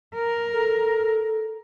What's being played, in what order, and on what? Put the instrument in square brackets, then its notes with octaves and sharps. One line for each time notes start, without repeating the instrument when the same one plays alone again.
[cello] A#4
[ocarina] A4